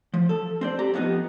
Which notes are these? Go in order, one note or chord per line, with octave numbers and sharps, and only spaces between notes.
F3
A4
C4 C5 D5
G4 A#5
F2 F3 B3 C#4 D#4